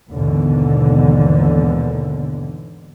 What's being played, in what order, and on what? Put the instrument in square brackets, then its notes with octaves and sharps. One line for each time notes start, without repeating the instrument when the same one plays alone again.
[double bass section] D#2 G#2 B2 D3 E3